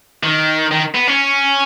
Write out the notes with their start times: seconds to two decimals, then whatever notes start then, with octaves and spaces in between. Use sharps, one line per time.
0.23 D#3
0.71 D#3
0.95 B3
1.07 C#4